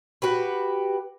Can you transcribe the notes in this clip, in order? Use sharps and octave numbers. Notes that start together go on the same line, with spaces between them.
F#4 G4 B4